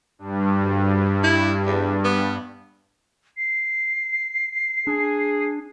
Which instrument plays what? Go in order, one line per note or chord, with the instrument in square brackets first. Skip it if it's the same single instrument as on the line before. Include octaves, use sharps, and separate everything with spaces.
[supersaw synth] G2
[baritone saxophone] D2
E4
E2
B3
[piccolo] C7
[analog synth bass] D4 [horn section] G#4